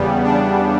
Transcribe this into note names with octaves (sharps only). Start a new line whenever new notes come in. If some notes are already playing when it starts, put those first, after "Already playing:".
Already playing: E2 C#3 G3 B3
D4